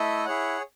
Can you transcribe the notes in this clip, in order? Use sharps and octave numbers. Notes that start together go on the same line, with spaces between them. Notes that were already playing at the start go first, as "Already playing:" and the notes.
Already playing: A3 E4 A4 D#5
E4 G#4 C#5 F#5